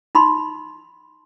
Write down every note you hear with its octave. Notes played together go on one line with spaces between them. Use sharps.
D#4 B5 C6